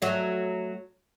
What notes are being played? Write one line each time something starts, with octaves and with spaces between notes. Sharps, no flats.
F#3 A3